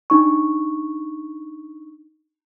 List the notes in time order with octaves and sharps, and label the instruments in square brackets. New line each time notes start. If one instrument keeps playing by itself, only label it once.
[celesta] D4 D#4 C#6